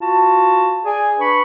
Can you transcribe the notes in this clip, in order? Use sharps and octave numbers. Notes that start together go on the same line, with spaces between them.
F4 F#4 A5
G#4 D5 G#5
D4 B4 B5 C#6